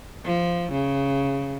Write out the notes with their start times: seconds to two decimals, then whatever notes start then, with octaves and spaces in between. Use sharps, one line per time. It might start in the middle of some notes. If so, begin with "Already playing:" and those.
0.25 F3
0.72 C#3